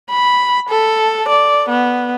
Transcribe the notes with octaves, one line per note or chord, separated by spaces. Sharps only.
B5
A4
D5
B3